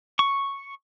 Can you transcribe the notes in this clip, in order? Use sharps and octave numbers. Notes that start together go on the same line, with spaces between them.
C#6